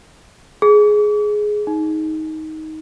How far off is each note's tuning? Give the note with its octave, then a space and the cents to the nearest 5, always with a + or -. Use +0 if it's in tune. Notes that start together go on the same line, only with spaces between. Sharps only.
G#4 +10
D#4 +15